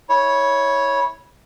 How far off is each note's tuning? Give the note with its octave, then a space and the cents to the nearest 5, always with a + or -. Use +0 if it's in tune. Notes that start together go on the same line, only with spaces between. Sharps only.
E4 -20 C#5 +0